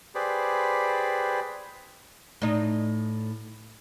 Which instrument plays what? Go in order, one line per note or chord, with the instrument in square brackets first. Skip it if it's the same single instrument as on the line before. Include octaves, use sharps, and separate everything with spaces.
[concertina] G4 G#4 B4 C5 D5 B5
[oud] A2 D#4